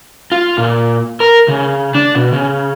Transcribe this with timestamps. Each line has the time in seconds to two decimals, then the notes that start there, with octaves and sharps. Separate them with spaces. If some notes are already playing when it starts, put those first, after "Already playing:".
0.32 F4
0.58 A#2
1.20 A#4
1.48 C#3
1.95 D4
2.15 B2
2.32 C#3